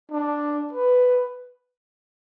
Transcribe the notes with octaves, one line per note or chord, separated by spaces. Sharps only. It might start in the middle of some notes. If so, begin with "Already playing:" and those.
D4
B4